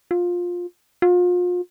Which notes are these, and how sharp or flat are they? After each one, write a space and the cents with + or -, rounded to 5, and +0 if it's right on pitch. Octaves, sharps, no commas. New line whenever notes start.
F4 +15
F4 +35